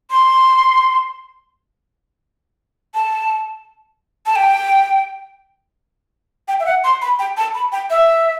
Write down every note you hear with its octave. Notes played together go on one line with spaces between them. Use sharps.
C6
A5
A5
G5
G5
E5
F#5
C6
B5
G5
A5
B5
G5
E5